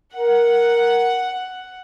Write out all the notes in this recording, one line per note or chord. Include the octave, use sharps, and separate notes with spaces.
A#4 F#5